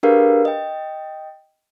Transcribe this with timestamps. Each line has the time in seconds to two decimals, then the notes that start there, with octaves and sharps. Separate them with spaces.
0.03 D4 G4 G#4 A#4 B4 F5
0.45 D#5 G5